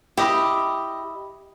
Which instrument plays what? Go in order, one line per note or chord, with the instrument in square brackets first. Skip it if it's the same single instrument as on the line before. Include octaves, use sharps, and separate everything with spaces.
[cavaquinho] E4 D#5 B5 [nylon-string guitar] G4